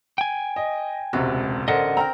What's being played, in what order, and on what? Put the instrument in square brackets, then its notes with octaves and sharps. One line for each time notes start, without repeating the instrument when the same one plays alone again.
[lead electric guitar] G5 G#5
[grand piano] D#5
[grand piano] E1 C#2 C3 [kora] F#4
[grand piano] A1 A#4 C5 [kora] D3 [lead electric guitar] D#5 F#5
[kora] C4 A#4 [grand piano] A#5